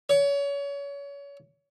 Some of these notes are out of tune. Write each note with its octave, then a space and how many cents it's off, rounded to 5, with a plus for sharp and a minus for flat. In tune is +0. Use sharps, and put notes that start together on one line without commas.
C#5 +30